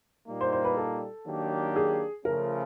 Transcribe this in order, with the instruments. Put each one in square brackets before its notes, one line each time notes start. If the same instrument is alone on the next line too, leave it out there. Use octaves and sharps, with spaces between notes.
[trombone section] A#2 G3 A#3 D#4
[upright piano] C5
C5
B4
A4
[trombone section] D#3 F#3 A#3 D4 G4
[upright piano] G#4
[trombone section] C#3 F3 A3 C#4 F4 [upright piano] A#4